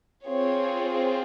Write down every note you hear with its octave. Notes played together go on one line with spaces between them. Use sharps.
C4 F4 G#4 C#5